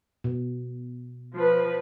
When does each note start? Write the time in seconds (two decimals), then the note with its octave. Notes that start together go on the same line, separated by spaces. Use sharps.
0.24 B2
1.34 F3 B4